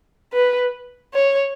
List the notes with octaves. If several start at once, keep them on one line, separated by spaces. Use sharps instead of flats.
B4
C#5